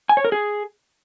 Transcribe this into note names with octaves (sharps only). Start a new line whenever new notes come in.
G#5
C#5
A#4
G#4